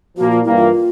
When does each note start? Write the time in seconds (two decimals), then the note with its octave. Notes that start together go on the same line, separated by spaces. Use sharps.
0.17 A#2 F3 A#3 F#4
0.31 F4
0.43 G2 E3 G3 A#3 E4
0.56 F4